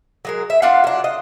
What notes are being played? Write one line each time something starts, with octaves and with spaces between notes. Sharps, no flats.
F#3 G#3 A#4
E5
D4 F4 F5 F#5
F#3 D4
D#5